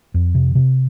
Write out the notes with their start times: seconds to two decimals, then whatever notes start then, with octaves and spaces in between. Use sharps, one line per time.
0.14 F2
0.35 C3
0.55 C3